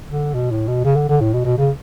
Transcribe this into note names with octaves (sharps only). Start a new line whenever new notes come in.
D3
B2
A2
B2
C#3
D3
D3
A2
B2
B2
C#3